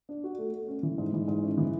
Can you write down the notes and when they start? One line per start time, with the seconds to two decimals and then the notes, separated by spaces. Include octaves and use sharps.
0.09 D4
0.24 F#4
0.38 A3
0.53 A3
0.68 C#4
0.83 E3
0.98 G#2
1.13 E3
1.28 G#2
1.43 C#4
1.57 E3